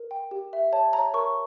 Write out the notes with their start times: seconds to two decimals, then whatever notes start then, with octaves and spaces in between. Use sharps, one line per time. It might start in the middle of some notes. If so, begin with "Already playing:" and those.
Already playing: A#4
0.11 G5
0.31 G4
0.53 E5
0.72 C#5 A5
0.93 C#5 A#5
1.14 A#4 C#6